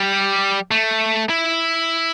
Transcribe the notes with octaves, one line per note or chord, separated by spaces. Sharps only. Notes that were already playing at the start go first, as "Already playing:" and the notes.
Already playing: G3
A3
E4